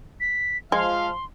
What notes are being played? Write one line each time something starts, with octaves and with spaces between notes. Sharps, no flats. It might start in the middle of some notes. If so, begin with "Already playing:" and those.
B6
F3 G#3 F5 C6